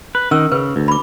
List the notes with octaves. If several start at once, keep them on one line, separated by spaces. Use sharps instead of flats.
B4
D#3 C#4 E6
C#3 B4
D2
B5 D6